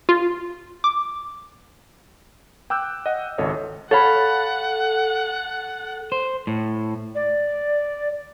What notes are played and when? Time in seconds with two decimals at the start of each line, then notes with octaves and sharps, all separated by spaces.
0.09 F4
0.84 D6
2.70 G5 D6 E6 F#6 G6
3.06 D#5 F#5
3.38 G#1 C#2 A4 C#5 D#5
3.91 A4 C#5 F5 F#5 B5
6.12 C5
6.47 A2
7.15 D5